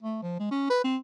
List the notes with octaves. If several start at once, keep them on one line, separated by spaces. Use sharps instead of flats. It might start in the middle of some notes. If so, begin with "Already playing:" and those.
A3
F3
G#3
C#4
B4
C4